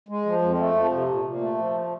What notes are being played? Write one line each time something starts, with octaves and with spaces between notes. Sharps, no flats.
G#3
F3
F2
A3
F3
C3
A#2
A#2
A3
F3